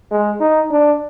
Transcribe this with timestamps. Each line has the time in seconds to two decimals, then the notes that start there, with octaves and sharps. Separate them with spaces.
0.11 G#3
0.40 D#4
0.71 D4